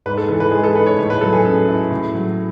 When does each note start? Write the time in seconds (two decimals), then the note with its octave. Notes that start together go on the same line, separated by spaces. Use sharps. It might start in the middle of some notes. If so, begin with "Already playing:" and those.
0.06 G#2 B4
0.17 A4
0.28 E3 A4
0.40 B4
0.51 G#3 G#4
0.64 A4
0.75 D#4 B4
0.87 C#5
0.98 A2
1.10 B4
1.21 F#3 A4
1.33 G#4
1.45 C#4 A4
1.68 E4
1.90 A2
2.14 F#3